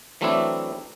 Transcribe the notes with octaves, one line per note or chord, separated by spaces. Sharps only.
E3 F#3 A3 C4 D4 E4